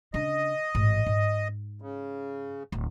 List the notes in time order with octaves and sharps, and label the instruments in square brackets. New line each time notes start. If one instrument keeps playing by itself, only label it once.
[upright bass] C#3 D4 [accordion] D#5
[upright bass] A1 G#2
G#2
[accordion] C#3
[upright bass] D1